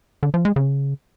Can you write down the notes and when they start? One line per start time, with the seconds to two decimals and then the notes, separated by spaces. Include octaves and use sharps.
0.23 D3
0.34 F3
0.45 G#3
0.56 C#3